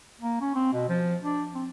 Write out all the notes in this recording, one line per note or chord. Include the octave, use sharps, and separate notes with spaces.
A#3
C#4
C4
B2
F3
D4
C4